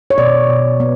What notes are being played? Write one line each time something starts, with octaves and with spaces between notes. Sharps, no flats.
C#5
B2 D5
B2
B3